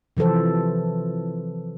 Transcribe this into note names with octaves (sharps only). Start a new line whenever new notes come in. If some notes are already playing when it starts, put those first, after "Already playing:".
C3 E3 F3 A4 C5